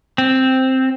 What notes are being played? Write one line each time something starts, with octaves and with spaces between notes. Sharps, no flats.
C4